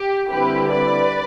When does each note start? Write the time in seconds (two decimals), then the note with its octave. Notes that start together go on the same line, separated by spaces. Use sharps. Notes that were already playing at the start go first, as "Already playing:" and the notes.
Already playing: G4
0.29 D3 G3 C4 E4 G4 B4
0.70 B4 D5